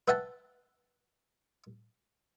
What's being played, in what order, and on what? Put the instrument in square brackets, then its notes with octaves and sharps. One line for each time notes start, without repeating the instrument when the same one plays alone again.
[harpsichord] B4 E5 F#5 G5 A5